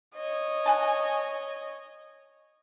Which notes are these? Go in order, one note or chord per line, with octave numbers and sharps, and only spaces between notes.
C#5 D#5
F#5 G#5 A5